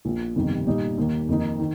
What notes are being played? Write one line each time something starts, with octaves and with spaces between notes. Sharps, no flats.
A#1 A#2 A#3 F4
G1 F2 C3 D#3 G3
A#2 G3 D#4
D#2 D#3 A#3
F2 D#3 A#3 D#4
D#3